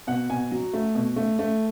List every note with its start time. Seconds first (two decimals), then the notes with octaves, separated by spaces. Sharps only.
0.07 B2 F#5
0.30 B2 G#5
0.51 F#3
0.73 A3
0.95 B2
1.16 A3
1.39 A3